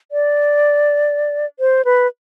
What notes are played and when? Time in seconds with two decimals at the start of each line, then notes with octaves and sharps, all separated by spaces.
0.12 D5
1.60 C5
1.85 B4